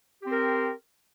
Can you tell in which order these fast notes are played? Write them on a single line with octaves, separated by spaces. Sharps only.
G4 C4 A#4